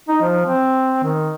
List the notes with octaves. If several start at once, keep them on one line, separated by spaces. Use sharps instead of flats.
D#4
F3
C4
D#3